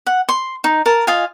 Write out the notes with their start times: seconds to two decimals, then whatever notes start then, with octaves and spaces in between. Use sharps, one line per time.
0.07 F#5
0.29 C6
0.64 D#4
0.86 A#4 A5
1.07 F4 D#5 F5 G#5